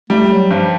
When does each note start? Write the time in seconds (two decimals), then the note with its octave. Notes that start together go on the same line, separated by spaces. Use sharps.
0.10 G3 A3
0.30 F#3
0.51 G2 F3